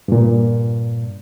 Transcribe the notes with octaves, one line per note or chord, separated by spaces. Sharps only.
G2 A#2